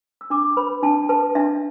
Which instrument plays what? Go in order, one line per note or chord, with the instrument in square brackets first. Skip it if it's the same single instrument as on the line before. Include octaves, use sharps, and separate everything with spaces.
[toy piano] E6
D4 D6
B4 B5
D4 A5
B4 A5
D4 E5